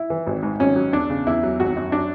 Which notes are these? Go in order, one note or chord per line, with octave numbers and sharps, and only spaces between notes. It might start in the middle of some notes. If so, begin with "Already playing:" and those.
Already playing: E4
E3
G#1
G#2
G#1 C#4
F#3
E2 D4
C#3
E2 E4
F#3
G#1 F#4
F#2
F#3 D4